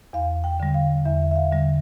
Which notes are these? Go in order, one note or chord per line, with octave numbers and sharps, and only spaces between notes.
E2 F5
G5
D3 G3
F5
E2 E5
E5
F5
D3 G3